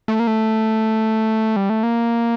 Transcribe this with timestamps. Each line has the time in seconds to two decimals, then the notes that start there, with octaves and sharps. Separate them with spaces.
0.08 A3
0.20 A#3
0.27 A3
1.56 G3
1.70 A3
1.83 A#3